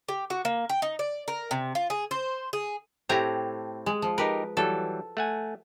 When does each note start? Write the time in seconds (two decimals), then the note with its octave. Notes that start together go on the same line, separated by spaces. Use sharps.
0.08 G4
0.30 F#4
0.45 A#3
0.69 G5
0.82 D#4
0.99 D5
1.28 A#4
1.51 C3
1.75 F4
1.90 G#4
2.11 C5
2.53 G#4
3.09 A2 A3 C4 G4 G#5 A#5
3.86 G#3
4.02 F3
4.18 D#4 G4 A#4 B4
4.57 E3 F#3 G3 A4
5.17 A3 F#5 G#5